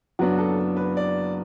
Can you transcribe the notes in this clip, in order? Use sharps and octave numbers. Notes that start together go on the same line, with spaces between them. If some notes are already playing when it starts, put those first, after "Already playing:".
F#1 F#2 F#3 B3 D4 F#4
A4
B4
D5